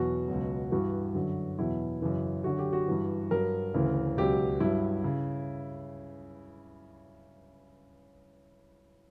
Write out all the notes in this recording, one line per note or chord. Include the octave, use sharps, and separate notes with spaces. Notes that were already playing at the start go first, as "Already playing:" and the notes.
Already playing: E2 B2 F#3 F#4
C#2 B2 F#3
G2 E3 F#4
F#2 D3 F#3
E2 B2 F#3 E4
F#2 C#3 E3
F#2 D3 F#3 F#4
G4
F#4
G2 E3
G2 F#3 A#4
D2 C#3 E3
C#2 B2 F#3 G4
G2 F#3 E4
C#3